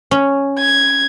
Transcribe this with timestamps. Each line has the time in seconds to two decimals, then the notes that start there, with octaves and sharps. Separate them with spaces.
0.11 C#4
0.59 G#6